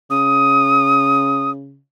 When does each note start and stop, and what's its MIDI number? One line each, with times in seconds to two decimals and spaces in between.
0.10 1.79 49
0.10 1.50 87